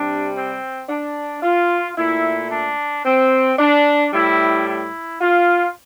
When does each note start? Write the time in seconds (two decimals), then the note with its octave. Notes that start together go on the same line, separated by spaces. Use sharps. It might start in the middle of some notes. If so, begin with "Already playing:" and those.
Already playing: C3 G3 D4
0.35 C4
0.89 D4
1.43 F4
1.97 A#2 A3 E4
2.51 D4
3.05 C4
3.59 D4
4.13 A2 G3 E4
4.68 E4
5.21 F4